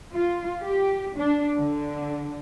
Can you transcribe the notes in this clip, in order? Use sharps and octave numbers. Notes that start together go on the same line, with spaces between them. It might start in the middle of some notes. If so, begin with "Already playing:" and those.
F4
G4
D4
D3